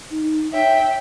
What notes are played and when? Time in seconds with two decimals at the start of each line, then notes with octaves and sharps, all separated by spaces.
0.11 D#4
0.52 C#5 E5 G5